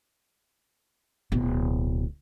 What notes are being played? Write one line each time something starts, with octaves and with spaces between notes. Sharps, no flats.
D1 B2